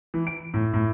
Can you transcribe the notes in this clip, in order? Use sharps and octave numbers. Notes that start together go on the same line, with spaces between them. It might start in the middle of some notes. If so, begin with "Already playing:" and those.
E3
D7
A2
A2